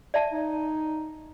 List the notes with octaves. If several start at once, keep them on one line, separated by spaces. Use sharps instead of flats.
D5 E5 A5
D#4